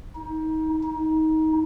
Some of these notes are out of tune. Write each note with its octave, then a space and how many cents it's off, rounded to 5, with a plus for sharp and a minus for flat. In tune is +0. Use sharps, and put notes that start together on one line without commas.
D#4 +25
D#4 +20